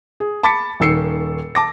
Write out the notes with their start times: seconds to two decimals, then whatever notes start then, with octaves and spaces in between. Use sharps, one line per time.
0.20 G#4
0.43 A5 B5 D6 A6 B6 C#7
0.80 D#1 D#3 E6 C7 C#7
1.55 A5 D6 A#6